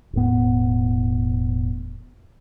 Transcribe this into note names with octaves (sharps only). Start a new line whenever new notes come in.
E1 A2 B3